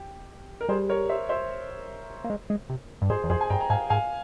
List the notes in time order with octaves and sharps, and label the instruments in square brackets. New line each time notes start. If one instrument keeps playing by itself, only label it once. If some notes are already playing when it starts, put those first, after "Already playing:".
Already playing: [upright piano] G4
A#4
[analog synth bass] G3 [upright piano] G#4 C5
[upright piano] A#4 C#5
C5 E5
C5 E5
[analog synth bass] A#3
G#3
G#3
C3
G2
[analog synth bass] G#2 [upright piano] G#4 C5
[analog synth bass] E2
[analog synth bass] F2 [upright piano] G#4 C5
[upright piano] G#5
[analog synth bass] G2 [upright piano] G5 A#5
[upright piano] A#5
[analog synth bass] G#2 [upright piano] F5 G#5
[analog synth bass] G#2 [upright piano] F5 G#5